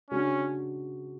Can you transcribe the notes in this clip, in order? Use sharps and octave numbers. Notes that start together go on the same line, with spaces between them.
C#3 G#3 C#4 D4 F#4